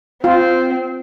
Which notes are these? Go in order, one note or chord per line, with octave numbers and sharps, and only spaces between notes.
C4 F4